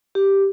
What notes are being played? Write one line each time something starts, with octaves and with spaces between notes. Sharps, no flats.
G4